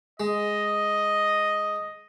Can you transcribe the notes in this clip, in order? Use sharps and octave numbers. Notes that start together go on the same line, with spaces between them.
G#3 D#5